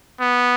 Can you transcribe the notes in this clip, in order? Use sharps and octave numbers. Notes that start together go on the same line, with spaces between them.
B3